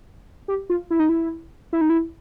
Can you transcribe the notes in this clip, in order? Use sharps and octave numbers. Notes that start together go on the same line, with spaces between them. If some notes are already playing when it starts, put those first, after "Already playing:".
G4
F4
E4
D#4
E4
E4
D#4
E4